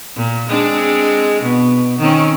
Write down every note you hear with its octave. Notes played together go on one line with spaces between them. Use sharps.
A#2
G#3 C4 D4
B2
D#3 C4 C#4